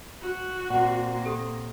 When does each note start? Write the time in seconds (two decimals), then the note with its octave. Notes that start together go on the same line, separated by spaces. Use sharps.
0.21 F#4
0.70 A#2 A#3 C4 F#5
1.24 G4 A4 D#6